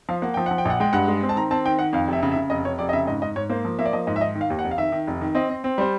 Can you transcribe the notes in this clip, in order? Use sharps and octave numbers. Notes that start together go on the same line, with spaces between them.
F3 F5
A#3 F#5
F3 G5
F3 F#5
G5
A#1 F#5
G#3 G5
G2 F#5
G#3
C4
A5
D#3 A#5
C4 A5
D#3 G5
D#3 F#5
F2 F5
F1 E5
C#3
E5
C#3
F1 D#5
F1 C#5
F1 D5
D#5
C#3 E5
G#2 D#5
G#2 D#5
G#2 C#5
A#3 C5
F3
A#3 E5
D5
F3 D#5
G#2 D#5
E5
D#3 D#5
D#3
F5
D#2
F#5
F1
F5
D#3 E5
D#3
F1
D#3
C4 D#5
C4
C4
G3 C5